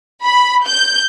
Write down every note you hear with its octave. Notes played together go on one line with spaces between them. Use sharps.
B5
G6